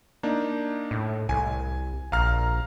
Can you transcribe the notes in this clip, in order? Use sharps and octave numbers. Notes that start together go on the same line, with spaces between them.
A#3 D4 D#4
A2
C2 G#5
A#1 F5 A#5 F6